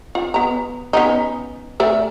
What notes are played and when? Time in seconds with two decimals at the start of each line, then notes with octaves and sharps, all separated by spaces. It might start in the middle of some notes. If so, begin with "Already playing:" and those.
0.15 F4
0.34 B3 A#5
0.93 B3 C#4 D#4
1.80 A3 D5 E5